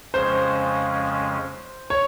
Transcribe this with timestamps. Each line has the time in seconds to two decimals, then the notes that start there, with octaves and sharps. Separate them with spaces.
0.13 F2 C#3 F3 G#3 C#4 C5
1.90 C#5